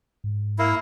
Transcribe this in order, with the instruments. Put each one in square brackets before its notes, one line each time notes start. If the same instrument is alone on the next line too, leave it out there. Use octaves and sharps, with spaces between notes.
[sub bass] G#2
[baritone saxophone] A#3 [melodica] E4